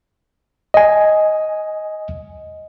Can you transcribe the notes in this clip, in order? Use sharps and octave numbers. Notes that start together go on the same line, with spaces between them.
D#5 G#5